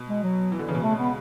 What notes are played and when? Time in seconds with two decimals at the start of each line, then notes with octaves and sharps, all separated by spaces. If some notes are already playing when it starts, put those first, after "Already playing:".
Already playing: B2
0.09 G#3
0.23 F#3
0.52 E3
0.59 D3
0.68 C#3 E3
0.75 B2
0.80 C#3
0.83 A3
0.91 G#3
0.99 B3